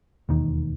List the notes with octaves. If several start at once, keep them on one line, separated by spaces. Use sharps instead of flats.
E1 D#2 D#3